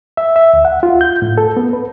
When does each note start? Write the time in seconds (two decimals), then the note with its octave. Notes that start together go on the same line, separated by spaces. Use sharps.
0.17 E5
0.36 E5
0.53 D2
0.65 F#5
0.83 F4
1.01 G6
1.22 A2
1.38 A4
1.57 B3
1.73 B4